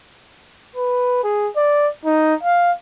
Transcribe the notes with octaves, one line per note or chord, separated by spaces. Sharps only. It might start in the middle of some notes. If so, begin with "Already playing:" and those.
B4
G#4
D5
D#4
F5